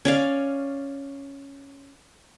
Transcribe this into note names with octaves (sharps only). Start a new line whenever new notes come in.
C#4 D5 F5